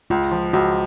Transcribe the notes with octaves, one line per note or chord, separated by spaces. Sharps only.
C#2 F4
F3
C#2 F#4